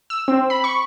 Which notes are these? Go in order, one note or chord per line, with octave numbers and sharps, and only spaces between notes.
E6
C4
B5
C#6